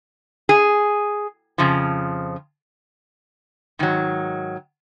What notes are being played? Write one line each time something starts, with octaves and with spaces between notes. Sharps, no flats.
G#4
F2 C#3 F3
G#2 D#3 F#3